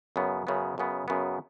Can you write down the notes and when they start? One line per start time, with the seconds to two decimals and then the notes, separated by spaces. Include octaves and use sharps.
0.16 F#2 C#3 B3
0.47 F#2 C#3 B3
0.78 F#2 C#3 B3
1.08 F#2 C#3 B3